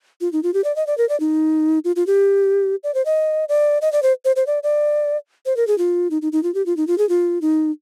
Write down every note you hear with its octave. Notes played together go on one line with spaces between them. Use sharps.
F4
D#4
F4
G4
D5
D#5
D5
A#4
D5
D#4
F4
F4
G4
D5
C5
D#5
D5
D#5
D5
C5
C5
C5
D5
D5
C5
A#4
G#4
F4
D#4
D#4
D#4
F4
G4
F4
D#4
F4
G#4
F4
D#4